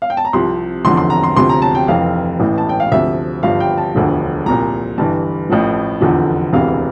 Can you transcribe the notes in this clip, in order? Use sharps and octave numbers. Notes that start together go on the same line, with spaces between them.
F5
G5
A5
A#5
C2 C3 F3 C6
F1 E2 D3 F3 C6
C6
A#5
C6
D2 C3 F3 C6
A#5
A5
G5
F1 F2 E3 F5
A1 A2 E3
A5
G5
F5
D2 C3 F3 E5
G1 G2 F3 F5
G5
A5
E1 D2 D3 F3
C2 A#2 F3 A#5
G1 G2 E3 A5
A1 A2 F3
F1 E2 D3 F3
E1 D2 C3 E3 F5